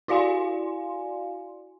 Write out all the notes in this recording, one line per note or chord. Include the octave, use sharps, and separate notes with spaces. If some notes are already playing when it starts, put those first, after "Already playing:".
E4 F#4 D5 F5 G#5 C6